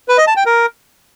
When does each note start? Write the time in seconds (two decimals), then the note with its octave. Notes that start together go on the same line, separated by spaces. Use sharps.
0.08 B4
0.18 D#5
0.27 A5
0.36 G5
0.46 A#4